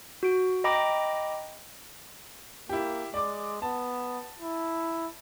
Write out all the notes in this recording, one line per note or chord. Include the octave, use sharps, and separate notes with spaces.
F#4 D7
D#5 G5 A#5 B5 D6 A#6
A#3 E4 G4
G#3 D5 D6
B3 A5
E4